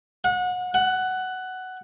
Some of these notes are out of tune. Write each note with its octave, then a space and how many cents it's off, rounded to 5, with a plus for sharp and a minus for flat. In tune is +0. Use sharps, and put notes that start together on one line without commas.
F#5 -30
F#5 +10